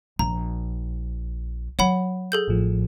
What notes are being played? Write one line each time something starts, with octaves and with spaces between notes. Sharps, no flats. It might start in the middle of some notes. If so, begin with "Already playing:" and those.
A#1 A#5
F#3 C#5 F#5 B5
G#4 A4 G6
A1 A2 F3